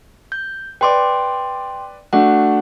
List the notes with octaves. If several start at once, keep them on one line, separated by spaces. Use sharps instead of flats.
G6
B4 D5 G5 C6 D6
A3 D4 F#4 F#5